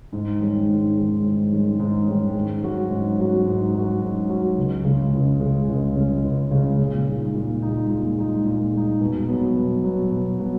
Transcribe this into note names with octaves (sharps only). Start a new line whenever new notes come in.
G#2
D#3 G#3 C#4
G#2
D#3 G#3 C#4
G#2
D#3 G#3 C#4
G#2
D#3 G#3 C#4
G#2
F#3 C#4 F#4
G#2
F#3 C#4 F#4
G#2
F#3 C#4 F#4
G#2
F#3 C#4 F#4
C#2
C#3 G#3 C#4
C#2
C#3 G#3 C#4
C#2
C#3 G#3 C#4
C#2
C#3 G#3 C#4
A#2
G#3 D#4
A#2
G#3 D#4
A#2
G#3 D#4
A#2
G#3 D#4
B2
F#3 B3
B2
F#3 B3
B2
F#3 B3